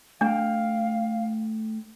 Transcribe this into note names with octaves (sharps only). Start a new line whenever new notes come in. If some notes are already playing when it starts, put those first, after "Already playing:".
A3 D4 F5 G5